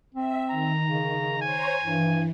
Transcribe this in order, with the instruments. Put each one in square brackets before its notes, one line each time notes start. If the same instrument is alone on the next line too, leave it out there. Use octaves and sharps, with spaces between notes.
[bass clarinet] C4 [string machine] E5
[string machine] D#3 [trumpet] A#5
[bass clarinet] C#3
[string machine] C5 C#5 A#5 [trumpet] G#5
[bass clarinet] G2 [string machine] E3